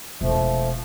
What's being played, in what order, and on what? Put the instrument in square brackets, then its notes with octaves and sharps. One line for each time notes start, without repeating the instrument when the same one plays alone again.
[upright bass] E1 [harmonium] F3 A3